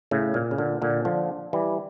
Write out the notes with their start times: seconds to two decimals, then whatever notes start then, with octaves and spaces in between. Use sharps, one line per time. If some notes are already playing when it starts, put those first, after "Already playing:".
0.11 A2 C#3
0.34 A#2
0.51 C#3
0.58 A#2 D3
0.82 A#2 D3
1.05 D3 F3
1.53 E3 G3